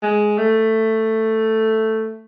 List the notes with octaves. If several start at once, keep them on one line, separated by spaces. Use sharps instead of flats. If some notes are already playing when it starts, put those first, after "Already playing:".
G#3
A3